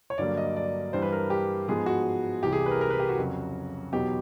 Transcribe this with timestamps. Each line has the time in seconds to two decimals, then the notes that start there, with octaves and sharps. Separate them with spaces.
0.10 C#5
0.18 G2 D3 F#3 A#3 D5
0.37 D#5
0.57 D5
0.93 G2 E3 G3 C5
1.02 B4
1.12 A#4
1.30 G4
1.68 G#2 F3 G#3 B3 G#4
1.86 F#4
2.43 C2 C3 E3 G4
2.52 G#4
2.66 B4
2.71 A#4
2.81 A#4
2.90 B4
3.00 G4
3.09 F#4
3.18 F2 C#3 F#3
3.93 E2 B2 F#3 B3 D#4 G4